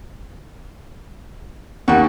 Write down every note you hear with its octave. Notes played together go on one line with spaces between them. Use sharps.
D#2 G3 F#4